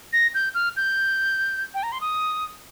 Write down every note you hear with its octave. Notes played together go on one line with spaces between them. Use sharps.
A#6
G6
F6
G6
G5
A#5
C6
D#6